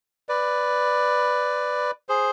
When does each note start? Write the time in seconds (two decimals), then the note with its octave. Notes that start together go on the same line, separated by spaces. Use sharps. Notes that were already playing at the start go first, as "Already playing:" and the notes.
0.29 B4 D5
2.09 G#4 C5